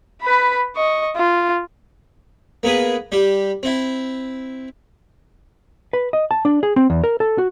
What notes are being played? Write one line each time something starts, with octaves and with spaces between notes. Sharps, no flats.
B4 B5
D#5 C#6
F4
A#3 B3 G#4 B4
G3 G4
C4 E4
B4
D#5
A5
D4
G#4
C4
E2
A#4
A4
F#4